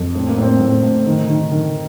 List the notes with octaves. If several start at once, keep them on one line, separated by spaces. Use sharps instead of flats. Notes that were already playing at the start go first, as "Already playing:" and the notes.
Already playing: F2
A2 C4
A#3
A2 C4
A2
A2
D#3
D#3
D#3